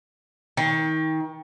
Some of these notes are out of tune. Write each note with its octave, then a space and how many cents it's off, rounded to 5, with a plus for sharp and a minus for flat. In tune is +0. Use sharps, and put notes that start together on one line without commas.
D#3 +30